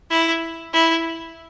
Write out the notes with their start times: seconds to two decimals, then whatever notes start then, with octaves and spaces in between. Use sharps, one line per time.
0.10 E4
0.73 E4